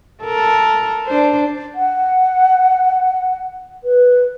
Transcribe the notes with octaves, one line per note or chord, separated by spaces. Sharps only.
A4 A#4
D4 C5
F#5
B4